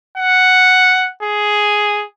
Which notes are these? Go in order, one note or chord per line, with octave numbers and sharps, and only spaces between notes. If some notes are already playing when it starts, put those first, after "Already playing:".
F#5
G#4